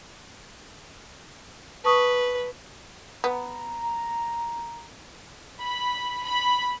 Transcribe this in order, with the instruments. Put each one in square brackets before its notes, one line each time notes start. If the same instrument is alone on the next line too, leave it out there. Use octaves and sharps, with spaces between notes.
[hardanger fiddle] B4 [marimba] A5 C#6 D#6
[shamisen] B3 [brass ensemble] A#5
[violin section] B5
B5